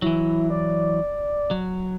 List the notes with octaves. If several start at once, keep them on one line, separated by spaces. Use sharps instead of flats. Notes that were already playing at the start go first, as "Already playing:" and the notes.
E3 F#3 E4
D5
F#3